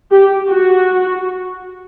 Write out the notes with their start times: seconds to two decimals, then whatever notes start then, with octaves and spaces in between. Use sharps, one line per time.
0.11 G4
0.49 F#4